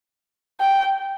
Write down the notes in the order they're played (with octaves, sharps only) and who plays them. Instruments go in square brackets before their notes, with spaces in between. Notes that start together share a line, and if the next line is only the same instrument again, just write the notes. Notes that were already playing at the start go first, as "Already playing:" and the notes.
[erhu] G5